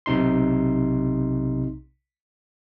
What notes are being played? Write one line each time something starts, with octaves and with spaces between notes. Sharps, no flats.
B1 C3 D#4 C6